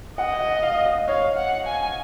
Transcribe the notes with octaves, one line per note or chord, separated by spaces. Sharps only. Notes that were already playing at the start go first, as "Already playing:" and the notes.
D#5 F#5
F#5
F5
D#5
C#5 F5
F#5
G#5